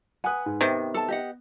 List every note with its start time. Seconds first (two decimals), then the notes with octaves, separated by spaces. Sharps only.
0.24 B4 F#5 G#5 D#6
0.46 G#2
0.61 C3 D#3 B3
0.94 A4 A5
1.08 G4 D#5 F#5